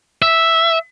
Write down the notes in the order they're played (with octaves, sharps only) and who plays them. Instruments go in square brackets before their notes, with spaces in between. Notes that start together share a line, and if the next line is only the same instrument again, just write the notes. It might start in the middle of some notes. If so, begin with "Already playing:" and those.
[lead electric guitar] E5